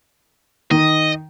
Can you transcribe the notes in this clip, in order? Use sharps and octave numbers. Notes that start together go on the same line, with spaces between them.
D#3 D#5